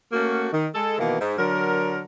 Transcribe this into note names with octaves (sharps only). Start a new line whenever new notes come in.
A3 A#3 C#4 F#4
D#3
G#3 A4
B2 D#3 E3 A#3
G#2
D3 F#3 A#4